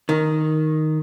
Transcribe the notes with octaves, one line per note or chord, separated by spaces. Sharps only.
D#3